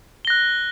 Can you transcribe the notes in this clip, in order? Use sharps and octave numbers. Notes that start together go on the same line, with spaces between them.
F#6 A#6 G7